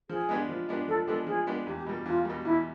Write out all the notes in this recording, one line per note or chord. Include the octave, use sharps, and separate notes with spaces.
F3 G#4
G#3 B3 D4 G4
F3
G#3 B3 D4 G4
F3 A4
G#3 B3 D4 G4 A4
F3 G#4
G#3 B3 D4 G4
E2 G4
B2 G3
E2 F4
B2 G3
E2 E4